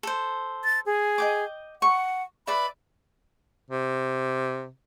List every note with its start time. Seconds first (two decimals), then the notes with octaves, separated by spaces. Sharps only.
0.03 A4 C5
0.64 A6
0.86 G#4
1.18 D#5 G5 D6
1.82 F#5 C#6
2.47 B4 D5 E5 B5
3.71 C3